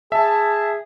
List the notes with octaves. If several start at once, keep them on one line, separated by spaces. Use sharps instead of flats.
G#4 E5 A5